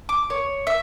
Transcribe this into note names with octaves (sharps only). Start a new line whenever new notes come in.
D6
C#5
E5